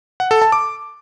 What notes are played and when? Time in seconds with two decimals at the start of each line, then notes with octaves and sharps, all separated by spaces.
0.20 F#5
0.31 A4
0.42 A5
0.52 D6